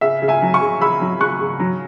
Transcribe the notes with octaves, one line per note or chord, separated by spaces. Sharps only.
C#3 E5
C#3
E5 G#5
F#3
G#5 C#6
C#3
C#3 B5 E6
F#3
C#3 C#6 F#6
C#3
F#3